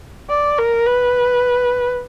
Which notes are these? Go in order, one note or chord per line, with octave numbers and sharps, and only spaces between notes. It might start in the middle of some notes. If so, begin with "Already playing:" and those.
D5
A#4
B4